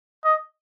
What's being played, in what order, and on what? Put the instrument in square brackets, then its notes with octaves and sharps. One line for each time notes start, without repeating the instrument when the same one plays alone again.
[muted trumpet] D#5